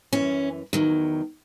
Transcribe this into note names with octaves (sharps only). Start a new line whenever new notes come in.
F#2 E3 C#4
E2 D#3 F#3